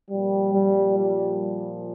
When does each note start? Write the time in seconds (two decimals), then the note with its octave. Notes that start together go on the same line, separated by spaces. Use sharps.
0.10 A#2 F3 G3
0.54 G3
0.98 G3